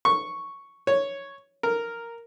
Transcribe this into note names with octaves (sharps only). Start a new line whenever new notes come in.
C#6
C#5
A#4